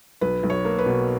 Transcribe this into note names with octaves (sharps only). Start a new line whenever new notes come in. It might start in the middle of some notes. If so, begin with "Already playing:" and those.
B1 B4
B1
C#5
A#3
B4
B2